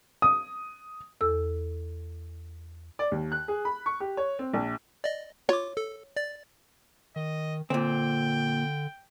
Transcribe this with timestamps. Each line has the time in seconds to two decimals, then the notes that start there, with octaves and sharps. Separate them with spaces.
0.22 D#6
1.21 E2 A4 E6
2.99 D5
3.12 D#2
3.32 F#6
3.48 G#4
3.65 B5
3.86 C#6
4.00 G4
4.17 C#5
4.39 C4
4.53 A#1
5.04 D5 D#5
5.49 F4 C#5 D6
5.77 A4
6.16 D5 A6
7.16 D#3 D#5
7.70 A#2 D3 C4 G5